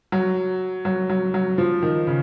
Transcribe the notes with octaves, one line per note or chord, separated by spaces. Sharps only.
F#3
F#3
F#3
F#3
F3
D#3
C#3